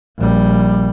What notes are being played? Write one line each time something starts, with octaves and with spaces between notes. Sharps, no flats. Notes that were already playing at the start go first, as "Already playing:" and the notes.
A#1 G3